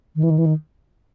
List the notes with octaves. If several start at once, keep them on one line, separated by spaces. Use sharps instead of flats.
D#3
E3
D#3
E3
D#3